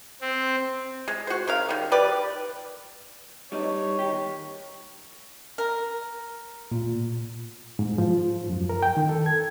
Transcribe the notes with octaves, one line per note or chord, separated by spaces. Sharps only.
C4
G#3
F#4 C5
C#3 A#4 F5
D#3 G3
G4 B4 D5
G3 D#4 C#5
D#3 G4
D#2
A#4
A#2
G#2
F3
F#2
A#4
G5
D#3
A4
G#6